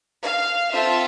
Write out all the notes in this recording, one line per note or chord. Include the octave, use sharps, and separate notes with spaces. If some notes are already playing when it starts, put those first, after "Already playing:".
F5
C4 F4 A4 E5